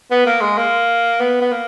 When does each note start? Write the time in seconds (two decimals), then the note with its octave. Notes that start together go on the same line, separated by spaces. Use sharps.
0.11 B3
0.26 A#3
0.41 G#3
0.57 A#3
1.20 B3
1.41 B3
1.51 A#3